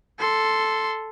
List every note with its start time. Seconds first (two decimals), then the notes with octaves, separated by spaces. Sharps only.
0.19 A4 C6